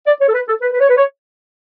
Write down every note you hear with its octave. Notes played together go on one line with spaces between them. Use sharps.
D5
C#5
A4
B4
A4
B4
B4
C#5
B4
C#5